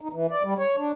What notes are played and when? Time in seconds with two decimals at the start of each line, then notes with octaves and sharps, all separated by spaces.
0.01 D#4
0.13 E3
0.31 D5
0.43 G3
0.58 C#5
0.77 D4